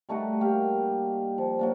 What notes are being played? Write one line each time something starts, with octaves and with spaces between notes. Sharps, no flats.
G3 A3 D#4 F#4
A#3 G4 F5
F3
F#3 A#3 D4